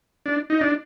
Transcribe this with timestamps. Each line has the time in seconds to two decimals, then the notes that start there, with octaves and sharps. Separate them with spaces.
0.26 D4
0.50 D#4
0.61 D4